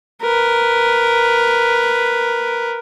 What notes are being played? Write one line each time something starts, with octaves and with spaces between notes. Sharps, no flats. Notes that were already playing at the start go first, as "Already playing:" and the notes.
A#4 B4